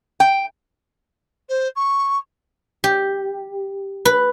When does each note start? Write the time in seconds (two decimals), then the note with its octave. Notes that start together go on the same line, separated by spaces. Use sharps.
0.20 G5
1.49 C5
1.75 C#6
2.84 G4
4.05 B4